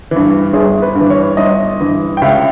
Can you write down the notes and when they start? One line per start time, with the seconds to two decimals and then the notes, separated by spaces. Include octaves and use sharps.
0.11 G2 E3
0.53 G1 G#4
0.82 B4
0.95 G2
1.01 E3
1.10 C#5
1.37 G1 D#5
1.80 G2 E3
2.17 G5
2.22 C#2 E5